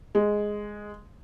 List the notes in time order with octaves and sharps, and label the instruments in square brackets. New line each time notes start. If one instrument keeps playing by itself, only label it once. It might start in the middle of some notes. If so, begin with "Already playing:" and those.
[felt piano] G#3